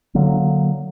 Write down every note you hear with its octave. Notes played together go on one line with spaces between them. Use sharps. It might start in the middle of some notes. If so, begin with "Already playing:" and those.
D3 F#3 A#3